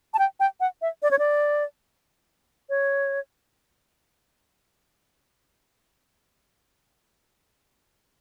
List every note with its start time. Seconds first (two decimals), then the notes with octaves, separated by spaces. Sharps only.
0.14 A5
0.19 G5
0.40 G5
0.60 F#5
0.82 E5
1.03 D5
1.11 C#5
1.19 D5
2.70 C#5